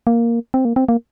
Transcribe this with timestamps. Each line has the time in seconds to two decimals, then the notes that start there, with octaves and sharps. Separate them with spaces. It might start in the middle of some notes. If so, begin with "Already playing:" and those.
0.07 A#3
0.54 C4
0.65 A#3
0.76 C4
0.89 A#3